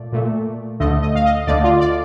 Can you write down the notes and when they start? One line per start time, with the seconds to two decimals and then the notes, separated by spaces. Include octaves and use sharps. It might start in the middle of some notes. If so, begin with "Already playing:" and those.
Already playing: A#2 A3 D5
0.12 A#2 A3
0.80 D2 D3 A3 D#5
1.02 D#5
1.15 F5
1.25 D#5
1.47 D2 D3 A3 D5
1.64 F4
1.81 D5